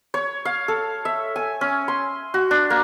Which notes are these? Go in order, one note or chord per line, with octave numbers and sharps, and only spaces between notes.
C#5
F5
A4
E5
G#5
C#4
C6
F#4
D4
A#3